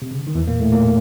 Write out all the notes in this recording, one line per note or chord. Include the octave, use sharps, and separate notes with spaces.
C3
C#3
D3
D#3
E2 E3
A#2 A#3
A2 A3
A#2 A#3